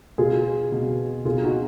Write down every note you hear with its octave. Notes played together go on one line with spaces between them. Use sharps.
B2 F4 G#4
B2
B2 F4 G#4
D#4 F#4